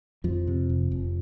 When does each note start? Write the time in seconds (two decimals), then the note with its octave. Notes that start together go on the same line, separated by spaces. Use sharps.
0.24 F2 F3
0.47 C3
0.70 F1
0.91 F1